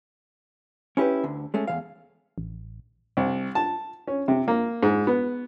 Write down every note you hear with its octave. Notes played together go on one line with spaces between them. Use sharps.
C#4 E4 G4 A#4 B4
D2 D3
G#3 A3 C#4
E2 E3 F5
A1
C2
A5
C#4
C3
A#3
G#2
B3